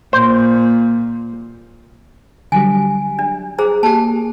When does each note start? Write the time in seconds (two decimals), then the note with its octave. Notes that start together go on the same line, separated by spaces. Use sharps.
0.13 A#2 C5
2.52 D3 F#3 G3 G#5
3.19 D4
3.59 G#4 C5 A#5
3.83 A#3 G4 G#4 A5